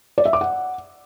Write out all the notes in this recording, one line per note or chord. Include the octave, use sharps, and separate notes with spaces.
D5
E5
D6
F#5